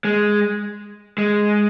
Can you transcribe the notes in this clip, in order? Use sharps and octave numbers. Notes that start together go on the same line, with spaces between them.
G#3
G#3